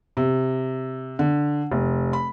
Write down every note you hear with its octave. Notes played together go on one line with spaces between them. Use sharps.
C3
D3
F1
B5